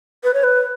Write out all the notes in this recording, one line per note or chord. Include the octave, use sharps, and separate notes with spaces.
B4
C#5
B4